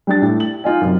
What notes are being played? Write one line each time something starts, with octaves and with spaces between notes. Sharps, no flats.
G3 D4 A6
A2
F#7
D#4 F4 D#5 G#5
F#2 C3